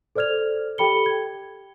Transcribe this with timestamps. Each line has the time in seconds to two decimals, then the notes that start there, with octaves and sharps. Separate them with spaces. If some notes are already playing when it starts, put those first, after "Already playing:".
0.16 A4 C5 D5 F6 G#6 F7
0.78 G4 A4 G5 B5 C#7 G7
1.06 G#6